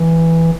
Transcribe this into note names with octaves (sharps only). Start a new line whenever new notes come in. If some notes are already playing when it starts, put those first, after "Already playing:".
Already playing: E3